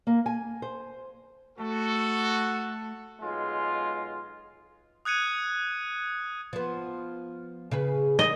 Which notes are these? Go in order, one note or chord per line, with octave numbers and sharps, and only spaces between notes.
A#3
G#5
C5
A3 F#4 A4
B1 G#3 F4
D#6 F#6 G#6 C#7 D#7
F3 B3
C#3 G#4 B4
G3 D#5